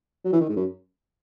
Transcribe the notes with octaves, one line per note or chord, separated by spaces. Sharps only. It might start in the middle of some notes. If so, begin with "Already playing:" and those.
F#3
E3
D#3
G#2
F#2